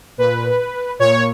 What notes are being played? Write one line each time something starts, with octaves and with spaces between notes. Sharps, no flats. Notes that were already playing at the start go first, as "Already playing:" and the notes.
A#2 B4
A#2 C#5